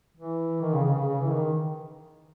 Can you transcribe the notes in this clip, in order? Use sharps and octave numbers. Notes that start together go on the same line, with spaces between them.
E3
D#3
C#3
C#3
C#3
C#3
E3
D#3